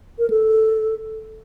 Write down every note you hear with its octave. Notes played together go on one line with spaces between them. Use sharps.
A#4
A4